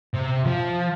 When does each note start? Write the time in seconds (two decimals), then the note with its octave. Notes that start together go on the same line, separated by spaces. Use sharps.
0.14 C3
0.46 F3